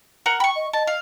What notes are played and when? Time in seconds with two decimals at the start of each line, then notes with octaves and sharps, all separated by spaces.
0.26 A#4 F#5
0.40 G5 B5 C#6
0.56 D#5
0.73 D#5 A5
0.87 F5